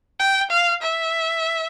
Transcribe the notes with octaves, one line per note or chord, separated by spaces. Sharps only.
G5
F5
E5